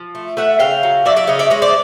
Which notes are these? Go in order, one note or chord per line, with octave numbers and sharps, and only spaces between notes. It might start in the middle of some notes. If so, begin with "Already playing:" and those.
Already playing: F3
A3
A3 E5 F#5
C#3 F5 G5
F#3
F#3 D5 E5
D5 E5
C#3 C#5 D#5
D5 E5
G#3 C#5 D#5
C5 D5